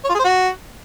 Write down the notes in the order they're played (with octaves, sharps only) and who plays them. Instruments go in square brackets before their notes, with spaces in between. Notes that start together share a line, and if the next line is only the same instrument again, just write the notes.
[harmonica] C#5
F4
G#4
C5
F#4